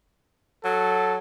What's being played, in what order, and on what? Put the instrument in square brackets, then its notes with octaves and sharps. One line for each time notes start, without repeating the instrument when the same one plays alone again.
[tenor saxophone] F#3 [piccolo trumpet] A4